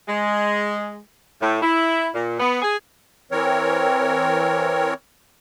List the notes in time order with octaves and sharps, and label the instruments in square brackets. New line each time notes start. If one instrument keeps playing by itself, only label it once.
[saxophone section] G#3
A2
E4
A#2
B3
G#4
[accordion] E3 C4 A#4 C#5